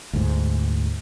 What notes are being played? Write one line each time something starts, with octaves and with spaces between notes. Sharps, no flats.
D2 G#2